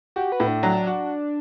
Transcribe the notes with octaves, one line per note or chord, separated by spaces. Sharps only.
F#4 G4
B4
A2
D4
F#3 D4
F#4